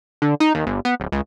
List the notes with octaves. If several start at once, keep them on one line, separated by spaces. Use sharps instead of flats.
D3
D#4
D#2
G1
B3
D1
C#2